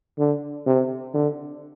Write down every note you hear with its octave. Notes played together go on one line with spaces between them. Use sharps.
D3
C3
D3